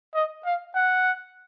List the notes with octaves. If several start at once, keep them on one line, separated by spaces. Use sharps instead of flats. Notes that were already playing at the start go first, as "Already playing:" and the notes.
D#5
F5
F#5